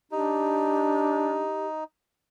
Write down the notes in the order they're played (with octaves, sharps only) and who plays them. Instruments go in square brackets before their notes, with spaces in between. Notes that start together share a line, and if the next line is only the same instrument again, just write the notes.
[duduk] D4 [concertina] D#4 [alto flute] G4